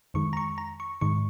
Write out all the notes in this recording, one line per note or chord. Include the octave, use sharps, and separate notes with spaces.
F2 D#3 G#3 C#6
A#5
C#6
A#5
C#6
G#2 D#3 G#3 C#6